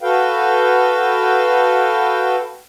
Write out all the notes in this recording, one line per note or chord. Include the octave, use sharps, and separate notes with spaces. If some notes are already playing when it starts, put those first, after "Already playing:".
F#4 A4 B4 F5 G5